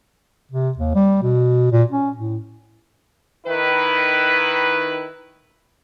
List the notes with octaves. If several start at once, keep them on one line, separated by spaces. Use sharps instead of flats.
C3
D#2
G3
B2
A#2
C#4
A2
D#3 E4 B4